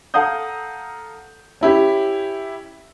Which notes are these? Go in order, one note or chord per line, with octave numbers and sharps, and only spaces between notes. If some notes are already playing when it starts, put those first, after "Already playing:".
A4 F5 F#5 A#5 D#6 G6
C#4 E4 G4